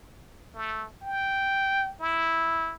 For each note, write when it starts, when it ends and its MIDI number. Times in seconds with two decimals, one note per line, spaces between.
0.54 0.86 57
1.02 1.93 79
2.00 2.73 64